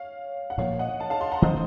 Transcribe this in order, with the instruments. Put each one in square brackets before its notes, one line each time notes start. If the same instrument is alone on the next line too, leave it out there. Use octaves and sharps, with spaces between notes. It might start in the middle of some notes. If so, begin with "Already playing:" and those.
Already playing: [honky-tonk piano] C#5 F5
F#5
[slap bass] A#2 F3 A#3 [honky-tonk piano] C#5 F5
[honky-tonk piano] D#5 F#5
F5 A5
F5 A5
A5 C6
F#5 A#5
[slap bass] D#3 A3 C#4 [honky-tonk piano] C5 D#5